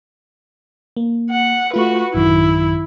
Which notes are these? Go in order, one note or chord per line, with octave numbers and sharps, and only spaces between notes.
A#3
F#5
A3 F4 F#4 B4
A1 F#2 D#3 E4